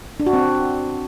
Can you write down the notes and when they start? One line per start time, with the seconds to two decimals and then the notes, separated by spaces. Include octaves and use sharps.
0.20 D4
0.26 F#4
0.33 C4